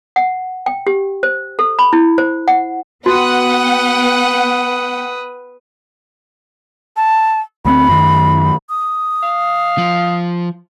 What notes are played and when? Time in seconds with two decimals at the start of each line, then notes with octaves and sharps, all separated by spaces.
0.16 F#5
0.66 G5
0.87 G4
1.23 C5
1.59 A4
1.79 B5
1.93 E4
2.18 C5
2.48 F#5
3.06 B3 F#4 B4 F#5 G5 D#6
6.97 A5
7.65 D2 B3 C4 B5
7.89 F#2 D#3
8.69 D#6
9.23 F5
9.78 F3